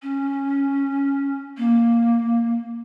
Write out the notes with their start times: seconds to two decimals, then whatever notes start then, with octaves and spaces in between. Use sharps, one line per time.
0.03 C#4
1.57 A#3